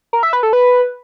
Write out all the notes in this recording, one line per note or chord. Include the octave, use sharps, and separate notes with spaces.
A#4
E5
B4
A4
B4